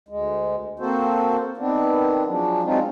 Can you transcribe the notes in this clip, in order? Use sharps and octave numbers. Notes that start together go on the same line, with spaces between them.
D2 G#3
A#3 C4 F#4 A4 C5
D#3 B3 C4 D4
F3 F#3 G#3 D4
F#3 G#3 C4 D4 D#4 F4